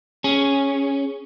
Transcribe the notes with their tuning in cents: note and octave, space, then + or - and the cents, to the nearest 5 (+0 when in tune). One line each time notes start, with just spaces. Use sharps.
C#4 +0 G#4 +0